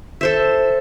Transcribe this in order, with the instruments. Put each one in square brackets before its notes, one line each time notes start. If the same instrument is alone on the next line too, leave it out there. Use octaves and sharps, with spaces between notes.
[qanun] A4 C5 E5